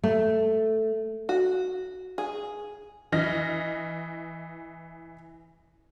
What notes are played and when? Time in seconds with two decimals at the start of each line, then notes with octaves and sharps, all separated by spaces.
0.04 A3
1.29 F#4
2.18 G#4
3.12 E3 D#5 F6 A#6